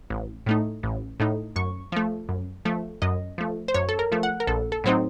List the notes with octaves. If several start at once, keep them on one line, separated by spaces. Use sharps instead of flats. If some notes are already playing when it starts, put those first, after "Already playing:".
A1
A2 A3 D#4
A1
A2 A3 D#4
F#2 C#6
F3 A3
F#2
F3 A3
F#2 D#5
F3 A3
C5
F#2 C#5
A4
A#4
F3 A3
F#5
A#4
A#1 A4
A4
A2 F#3 C4 D#4 C5